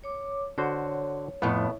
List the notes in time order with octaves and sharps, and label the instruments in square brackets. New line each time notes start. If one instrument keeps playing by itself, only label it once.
[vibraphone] C#5 D6
[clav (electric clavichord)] D3 F#4 C5 [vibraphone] C#5
[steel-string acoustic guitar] F2 A2 [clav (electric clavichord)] B3